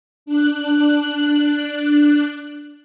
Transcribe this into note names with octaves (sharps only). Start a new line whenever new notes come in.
D4 F#6